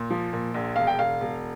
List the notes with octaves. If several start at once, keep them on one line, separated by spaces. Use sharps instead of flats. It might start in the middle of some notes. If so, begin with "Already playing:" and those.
Already playing: A#2
F3
A#2
A#1
E1 F5
G5
E1 F5
E1